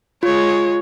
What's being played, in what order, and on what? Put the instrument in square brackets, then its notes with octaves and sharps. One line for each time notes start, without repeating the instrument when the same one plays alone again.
[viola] G#3 C#5 [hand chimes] F4